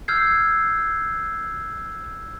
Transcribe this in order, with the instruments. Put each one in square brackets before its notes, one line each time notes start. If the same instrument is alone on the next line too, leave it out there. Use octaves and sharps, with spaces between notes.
[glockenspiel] E6 F6 G6 G#6 C7